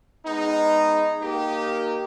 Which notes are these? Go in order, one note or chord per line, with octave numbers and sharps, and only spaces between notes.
G#3 B3 D#4
A#3 D#4 G4